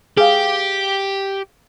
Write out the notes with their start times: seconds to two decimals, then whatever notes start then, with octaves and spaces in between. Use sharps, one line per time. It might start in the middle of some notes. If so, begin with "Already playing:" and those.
0.17 G4 G#4 B4 F5